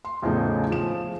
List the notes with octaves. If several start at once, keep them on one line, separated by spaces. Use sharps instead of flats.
C6
E2 A2 C#3 F3 A3 D#4
F3 G#4 E7